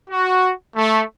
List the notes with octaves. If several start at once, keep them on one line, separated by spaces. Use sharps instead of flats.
F#4
A3